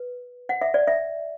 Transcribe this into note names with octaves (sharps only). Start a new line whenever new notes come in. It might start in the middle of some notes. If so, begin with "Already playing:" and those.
Already playing: B4
F#5
E5
D5
E5